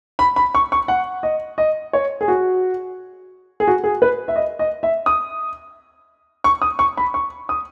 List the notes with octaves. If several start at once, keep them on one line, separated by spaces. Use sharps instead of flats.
B5
B5
C#6
C#6
F#5
D#5
D#5
C#5
G#4
F#4
G#4
F#4
G#4
B4
E5
D#5
D#5
E5
D#6
C#6
D#6
C#6
B5
C#6
D#6